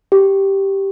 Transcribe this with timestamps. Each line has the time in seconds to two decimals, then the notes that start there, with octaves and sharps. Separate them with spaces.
0.12 G4